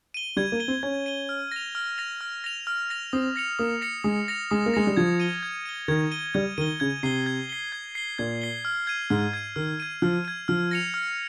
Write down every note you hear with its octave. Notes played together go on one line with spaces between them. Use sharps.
D#7 G7
G3 G#6
A#3
D#7 G7
C4
C#4 G#6
D#7 G7
F6
A#6 F7
F6
A#6 F7
F6
A#6 F7
F6
A#6 F7
C4 D#6
A#6 C#7 F7
A#3 D#6
A#6 C#7 F7
G#3 D#6
A#6 C#7 F7
G#3 D#6
A#3
G#3 A#6 C#7 F7
G3
F3 G#6
D#7 G7
G#6
D#7 G7
D#3 G#6
D#7 G7
G3 G#6
D#3 D#7 G7
C#3 G#6
C3 C7 G7
G#6
C7 G7
G#6
C7 G7
A#2 G#6
C7 G7
F6
G#6 D#7
G#2 F6
G#6 D#7
D#3 F6
G#6 D#7
F3 F6
G#6 D#7
F3 F6
A#6 C#7 F7
F6